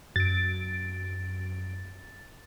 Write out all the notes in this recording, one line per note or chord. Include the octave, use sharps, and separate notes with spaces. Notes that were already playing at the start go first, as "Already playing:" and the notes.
F#2 A6 D7